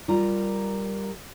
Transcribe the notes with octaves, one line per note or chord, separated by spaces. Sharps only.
G3 F4 A#4 A#5